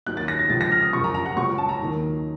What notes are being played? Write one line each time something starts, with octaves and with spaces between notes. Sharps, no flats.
D#2 D#3 F#3 F#6
A6
A#6
A6
C#2 C#3 F3 A6
A#6
F6
D#6
F#2 C#3 F3 C#6
A#5
A#5
F#5
C#2 C#3 F#3 C#6
A5
A#5
D#2 D#3 F#3